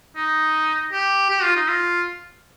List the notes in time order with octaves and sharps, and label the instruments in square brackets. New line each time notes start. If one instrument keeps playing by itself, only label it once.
[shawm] D#4
G4
G4
F4
D#4
F4